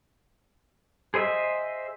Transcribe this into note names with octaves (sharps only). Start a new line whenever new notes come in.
G#4 C5 D#5 E5